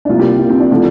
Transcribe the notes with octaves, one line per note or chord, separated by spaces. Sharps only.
D4
C2 C3 A#3 F4
G4
F4
C4
D4
D3 F3